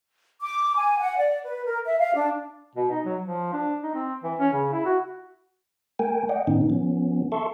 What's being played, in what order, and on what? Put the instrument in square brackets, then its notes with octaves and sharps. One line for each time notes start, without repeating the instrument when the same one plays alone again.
[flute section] D6
G#5
F#5
D5
B4
A#4
E5
F5
D4
[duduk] B2
D#4
F#3
F3
D4
D#4
C4
E3
C#4
C#3
E4
F#4
[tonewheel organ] A3 A#4 G5 G#5
D5 D#5 F#5 G5
A2 D#3 B3 C#4 D#4
F3 B3 C#4
A4 E5 A5 C6 C#6